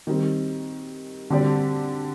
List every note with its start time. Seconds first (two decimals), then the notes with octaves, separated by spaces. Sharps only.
0.07 D#3 G3 C4
1.30 D3 G3 C4 G4 D5